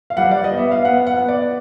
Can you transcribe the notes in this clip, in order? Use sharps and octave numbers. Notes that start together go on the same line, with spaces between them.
F5
G3 F#5
D5
D#5
B3
E5
F5
B3 F#5
F#5
B3
D5